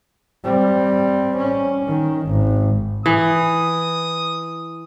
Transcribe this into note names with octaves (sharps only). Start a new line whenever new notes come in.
G3 C4
C#4
D#3
G#1
E3 D#6